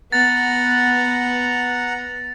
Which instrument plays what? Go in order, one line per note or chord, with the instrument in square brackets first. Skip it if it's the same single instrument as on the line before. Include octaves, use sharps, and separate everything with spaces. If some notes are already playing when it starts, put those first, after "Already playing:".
[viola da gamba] B3 [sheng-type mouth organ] F#5 A#5 [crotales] A6